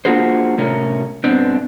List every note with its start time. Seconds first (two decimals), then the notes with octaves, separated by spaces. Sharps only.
0.05 A#3 D4 F4 F#4 G#4 C5
0.58 A2 C3 C#4 A#4
1.24 G2 B2 C4 D4